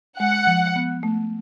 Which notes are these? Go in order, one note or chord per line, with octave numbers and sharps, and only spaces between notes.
G#3 F#5
F3
B3
A3